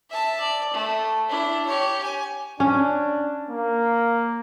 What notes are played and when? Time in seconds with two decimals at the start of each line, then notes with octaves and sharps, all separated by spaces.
0.10 E5 A5
0.40 D5
0.73 A3
1.29 D4 E4
1.66 G4 C#5
2.04 G#5
2.60 C#4 D4
3.50 A#3